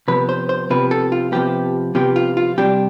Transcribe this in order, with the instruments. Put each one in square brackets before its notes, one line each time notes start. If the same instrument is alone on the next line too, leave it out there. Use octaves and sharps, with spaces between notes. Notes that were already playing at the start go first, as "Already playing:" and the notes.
[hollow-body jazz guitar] C3 F3 B3 B4
C5
C5
C3 F3 B3 B4
A4
F4
C3 F3 B3 G4
C3 F3 B3 G4
F4
F4
C3 G3 D4 G4